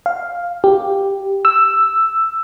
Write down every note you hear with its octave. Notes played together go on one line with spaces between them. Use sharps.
F5
G4
E6